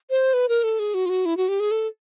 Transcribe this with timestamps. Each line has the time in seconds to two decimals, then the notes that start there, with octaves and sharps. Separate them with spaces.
0.10 C5
0.33 B4
0.49 A#4
0.63 A4
0.79 G#4
0.94 F#4
1.06 F4
1.09 F#4
1.25 E4
1.37 F#4
1.48 G4
1.60 G#4
1.71 A4